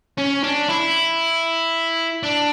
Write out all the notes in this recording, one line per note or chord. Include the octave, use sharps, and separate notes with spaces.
C#4
D4
E4
D4